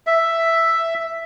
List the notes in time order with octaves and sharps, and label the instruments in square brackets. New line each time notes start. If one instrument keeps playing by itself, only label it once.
[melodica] E5